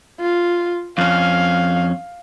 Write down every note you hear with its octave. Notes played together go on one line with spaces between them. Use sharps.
F4
F2 C#4 F5